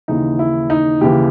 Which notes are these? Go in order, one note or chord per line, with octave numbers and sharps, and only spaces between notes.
D#2 C#3 E3 D#4
E4
D#4
D#2 C#3 E3 G4